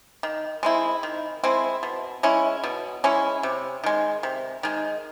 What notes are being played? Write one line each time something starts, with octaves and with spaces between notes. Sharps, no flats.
D#3
G#3 C4 E4
D#3
G#3 C4 E4
B2
G#3 C#4 E4
B2
G#3 C#4 E4
C3
D#3 G#3
C3
D#3 G#3